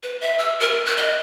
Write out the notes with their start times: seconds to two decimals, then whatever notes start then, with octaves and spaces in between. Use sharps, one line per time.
0.03 B4
0.21 E5
0.38 E6
0.60 A#4
0.86 F#6
0.97 D#5